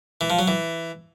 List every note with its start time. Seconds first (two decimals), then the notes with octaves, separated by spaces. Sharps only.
0.21 E3
0.30 F3
0.39 F#3
0.48 E3